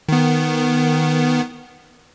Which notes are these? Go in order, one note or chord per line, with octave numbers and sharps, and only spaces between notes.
D#3 B3